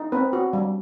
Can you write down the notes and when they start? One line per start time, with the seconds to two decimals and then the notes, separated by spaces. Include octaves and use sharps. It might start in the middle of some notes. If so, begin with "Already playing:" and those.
Already playing: D#4
0.12 C4 B4
0.33 F#4
0.53 G3